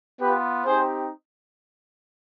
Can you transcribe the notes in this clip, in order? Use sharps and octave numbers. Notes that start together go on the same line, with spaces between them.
B3 F4 G4 B4
C4 D#4 G4 G#4 C5